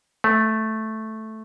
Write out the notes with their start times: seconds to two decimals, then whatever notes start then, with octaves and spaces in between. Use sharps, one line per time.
0.24 A3